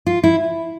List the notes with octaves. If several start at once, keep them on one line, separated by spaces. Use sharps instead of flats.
F4
E4